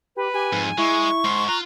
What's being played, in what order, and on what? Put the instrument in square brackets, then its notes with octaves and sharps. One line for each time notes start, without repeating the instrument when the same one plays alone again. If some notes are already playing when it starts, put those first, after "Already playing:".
[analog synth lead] G4 [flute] B4
[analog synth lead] G4 [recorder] G#5
[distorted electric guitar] F2 [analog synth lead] G#2
[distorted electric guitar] G#3 [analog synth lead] E4 [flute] C#6
[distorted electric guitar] G#2 [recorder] C6
[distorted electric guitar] F4 [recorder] A#5 [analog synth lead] F#6